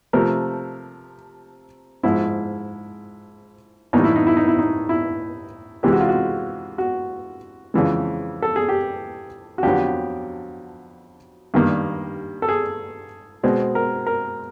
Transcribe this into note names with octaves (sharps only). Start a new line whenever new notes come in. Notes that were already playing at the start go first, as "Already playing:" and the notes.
C3 F3 A3 A#4
G#2 F3 G#3 E4
A2 E3 G3 A#3 D#4
E4
D#4
E4
D#4
E4
D#4
E4
C3 E3 G#3 G4
F#4
F4
F#4
F#4
F2 C#3 E3 G#3
A4
G#4
G4
F#4
F2 D3 F#3 B3 G4
G2 D#3 G3 A#3
A4
G#4
B2 G#3 C4
A#4
A#4